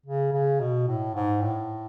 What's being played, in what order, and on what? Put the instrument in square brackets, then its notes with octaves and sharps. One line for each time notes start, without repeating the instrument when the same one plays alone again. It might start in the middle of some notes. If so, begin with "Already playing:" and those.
[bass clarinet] C#3
C#3
B2
A2
G#2
A2